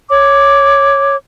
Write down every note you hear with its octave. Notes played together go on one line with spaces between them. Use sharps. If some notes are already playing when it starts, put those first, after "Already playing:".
C#5 D6